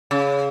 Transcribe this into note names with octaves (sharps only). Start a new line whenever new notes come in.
C#3